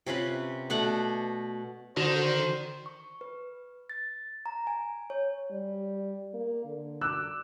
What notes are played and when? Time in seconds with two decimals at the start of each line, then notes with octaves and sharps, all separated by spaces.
0.07 C3 C#4 F4 B4
0.70 B2 A3 D5 F#5
1.97 D3 D#3 F#4 C5
2.86 C#6
3.21 B4
3.90 A6
4.46 A#5
4.67 G#5
5.10 C#5
5.51 G3
6.34 A#3
6.65 D3
7.01 D6 E6 F#6